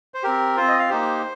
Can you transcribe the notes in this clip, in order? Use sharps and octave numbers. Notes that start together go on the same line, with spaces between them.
C5
C4 G4 A#4
C4 F4 C5
D#5
F5
A#3 D#4 G4 C5